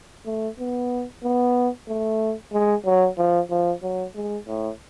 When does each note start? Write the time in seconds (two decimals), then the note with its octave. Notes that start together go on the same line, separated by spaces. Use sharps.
0.26 A3
0.59 B3
1.23 B3
1.88 A3
2.53 G#3
2.85 F#3
3.18 F3
3.50 F3
3.83 F#3
4.15 G#3
4.48 A2